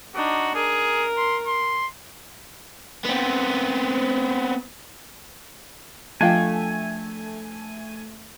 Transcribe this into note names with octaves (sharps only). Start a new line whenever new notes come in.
D4 D#4 F#4
G#4 A#4
C6
C6
B3 C4
F3 A3 D4 F4 F5 G5 G#5